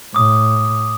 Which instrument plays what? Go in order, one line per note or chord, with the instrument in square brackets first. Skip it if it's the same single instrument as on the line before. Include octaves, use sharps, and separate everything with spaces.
[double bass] A2 [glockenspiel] D6 D#6